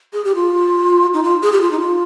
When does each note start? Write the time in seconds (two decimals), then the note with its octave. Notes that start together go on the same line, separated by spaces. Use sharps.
0.13 G#4
0.24 G4
0.35 F4
1.13 D#4
1.23 F4
1.43 G#4
1.52 G4
1.61 F4
1.71 D#4
1.80 F4